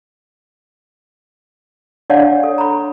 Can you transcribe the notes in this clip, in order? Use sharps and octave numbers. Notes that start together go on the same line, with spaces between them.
D4 C#5 D5 F5 F#5 A5
A4
A#5 B5